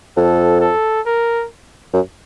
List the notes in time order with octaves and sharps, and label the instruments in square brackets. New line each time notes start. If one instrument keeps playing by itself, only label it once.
[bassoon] F2 [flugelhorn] A4
[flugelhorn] A4
A#4
[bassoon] F#2